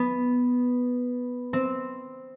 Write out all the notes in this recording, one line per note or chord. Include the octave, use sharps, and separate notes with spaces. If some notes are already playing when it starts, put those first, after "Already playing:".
Already playing: B3
C4